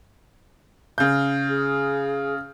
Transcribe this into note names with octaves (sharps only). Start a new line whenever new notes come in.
C#3 G6
G#4